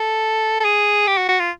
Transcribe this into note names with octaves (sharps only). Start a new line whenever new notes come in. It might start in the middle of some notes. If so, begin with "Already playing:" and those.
Already playing: A4
A4
G#4
G4
F#4
F#4
F4